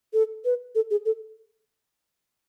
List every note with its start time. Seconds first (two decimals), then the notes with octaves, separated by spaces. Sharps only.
0.13 A4
0.45 B4
0.75 A4
0.91 G#4
1.06 A4